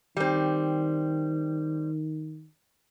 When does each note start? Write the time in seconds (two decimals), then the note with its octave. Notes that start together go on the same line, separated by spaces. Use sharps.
0.17 D#3 G3 C4